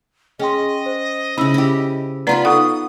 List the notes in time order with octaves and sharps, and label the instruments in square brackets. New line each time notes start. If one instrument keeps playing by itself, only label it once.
[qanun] C#4 [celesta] G#4 G5 C6 [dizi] D#5
[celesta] C5
[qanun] C#3 E4 [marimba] C#4 E6
[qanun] E4 G4
[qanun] B3 F4 B5 [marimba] B4 D5 A#5
[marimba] D#4 A4 F#5 [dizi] D#6